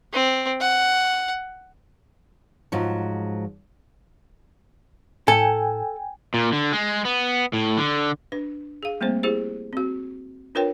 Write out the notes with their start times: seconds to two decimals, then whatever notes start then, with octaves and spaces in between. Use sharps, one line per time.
0.13 C4
0.61 F#5
2.72 G#2 F3 F#3
5.28 A2 A4 G5 G#5
6.34 A#2
6.52 D3
6.73 G#3
7.05 B3
7.53 A2
7.78 D3
8.32 D4 B4
8.83 G#4 F5
9.01 G3 A3 A#3 C4 C5
9.23 E4 G4 G#4 C5
9.73 C4 F#4
10.55 D4 F4 A#4 B4 C#5 G5